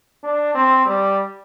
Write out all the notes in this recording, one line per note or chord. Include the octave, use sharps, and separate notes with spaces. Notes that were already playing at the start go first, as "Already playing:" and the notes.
D4
C4
G3